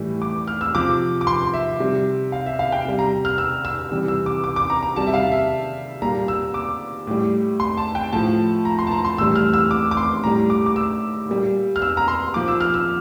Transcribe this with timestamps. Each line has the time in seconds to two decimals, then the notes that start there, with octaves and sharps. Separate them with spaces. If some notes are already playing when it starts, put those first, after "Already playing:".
Already playing: A2 E3 G3
0.22 D6
0.47 F6
0.61 E6
0.74 C3 F3 D6
1.21 D6
1.27 C6
1.54 E5
1.80 C3 G3
2.32 F5
2.46 E5
2.59 F5
2.72 G5
2.85 C3 G3
2.99 A#5
3.25 F6
3.38 E6
3.65 E6
3.91 C3 E3 G3
4.08 E6
4.26 D6
4.44 D6
4.56 D6
4.70 A#5
4.83 A#5
4.96 C3 G3 A5
5.07 E5
5.14 F5
5.32 E5
6.02 A#2 G3 A#5
6.28 E6
6.54 D6
7.07 A2 G3
7.60 C6
7.77 A5
7.95 G5
8.12 A2 F3 A5
8.65 A#5
8.79 C6
8.87 A5
8.92 A#5
9.05 C6
9.18 A2 E3 G3 E6
9.36 F6
9.54 E6
9.71 D6
9.91 D6
9.97 C6
10.24 A2 G3 A#5
10.50 D6
10.66 D6
10.76 E6
11.29 A#2 G3
11.76 F6
11.82 E6
11.97 A#5
12.08 C6
12.34 A#2 F3 D6
12.48 E6
12.61 F6
12.74 E6